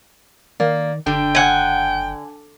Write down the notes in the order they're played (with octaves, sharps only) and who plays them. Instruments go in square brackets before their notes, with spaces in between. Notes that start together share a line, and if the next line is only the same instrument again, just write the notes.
[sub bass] D#3 [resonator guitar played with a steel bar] A#3 [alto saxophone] D5
[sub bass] F#1 [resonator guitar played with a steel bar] D3 [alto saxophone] G5
[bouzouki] F#5 G#5